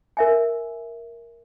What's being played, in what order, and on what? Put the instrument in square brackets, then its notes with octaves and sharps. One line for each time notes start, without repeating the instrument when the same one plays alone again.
[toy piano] A#4 E5 G#5